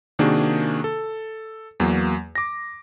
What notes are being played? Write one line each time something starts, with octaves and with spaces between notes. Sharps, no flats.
C3 D#3 A#3 D4 F#4 G#4
A4
E2 F#3 A#3
D6 A#6